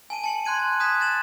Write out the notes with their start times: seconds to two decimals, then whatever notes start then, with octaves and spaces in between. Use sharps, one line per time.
0.10 G#5 A5 D#7
0.24 A5 C#7 F#7
0.45 C6 F#6 G#6 D#7
0.59 A5
0.80 D#6 F#6 G#6 B6 E7
1.00 F#6 A6 E7 F#7